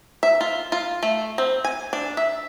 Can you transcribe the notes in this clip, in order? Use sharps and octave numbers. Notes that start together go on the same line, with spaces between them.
E5
F4
F4
A3
C4
G#5
D4
E5